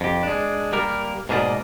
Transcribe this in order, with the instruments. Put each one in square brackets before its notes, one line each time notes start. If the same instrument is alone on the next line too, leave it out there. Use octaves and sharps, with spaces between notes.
[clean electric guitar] F2 G4
G#3 D4
G3 A#3 A#4
G#2 B2 A#3 G#4 D5 D#5